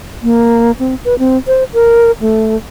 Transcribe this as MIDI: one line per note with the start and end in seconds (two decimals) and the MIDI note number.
0.23 0.71 58
0.79 0.95 60
1.05 1.17 71
1.19 1.37 60
1.47 1.64 72
1.74 2.11 70
2.21 2.56 57